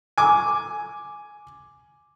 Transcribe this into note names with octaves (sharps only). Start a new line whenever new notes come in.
G#5 D6